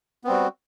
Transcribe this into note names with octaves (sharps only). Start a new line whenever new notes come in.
G3 B3 C4 F#4